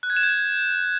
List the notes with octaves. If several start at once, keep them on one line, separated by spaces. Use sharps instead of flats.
F#6
G#6
E7
G6